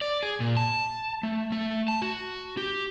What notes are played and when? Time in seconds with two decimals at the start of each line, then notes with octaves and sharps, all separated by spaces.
0.01 D5
0.23 G#4
0.40 A#2
0.57 A5
1.23 A3
1.52 A3
1.88 A5
2.02 F#4
2.57 G4